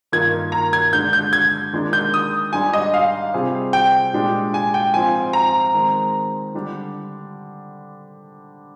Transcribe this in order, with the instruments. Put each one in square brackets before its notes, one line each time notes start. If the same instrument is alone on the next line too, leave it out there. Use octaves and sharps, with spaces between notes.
[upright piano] G2 D#3 A#3 F4 [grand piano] G#6
[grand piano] A#5
G#6
[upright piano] D3 G#3 D4 [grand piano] G6
[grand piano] G6
G#6
[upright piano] D#2 D#3 G#3 D4
[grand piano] G6
D#6
[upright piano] G#2 G3 D4 [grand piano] G#5
[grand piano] D#5
F5
[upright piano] C3 G3 C4 F4 G#4
[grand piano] G5
[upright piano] A#2 G#3 D4 G4
[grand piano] G#5
G5
[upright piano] G#2 F3 C4 F4 [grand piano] G#5
[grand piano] A#5
[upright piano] D#3 G#3 C4
D3 G3 D4